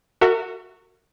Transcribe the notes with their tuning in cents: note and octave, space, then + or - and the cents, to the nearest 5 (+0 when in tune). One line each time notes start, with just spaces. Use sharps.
F#4 +0 A#4 -40 E5 +0